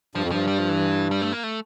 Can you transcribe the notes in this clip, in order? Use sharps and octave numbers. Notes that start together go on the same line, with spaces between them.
G2 F3
F2
G2 F3
G3
F3
E3
G3
A3
A#3
A3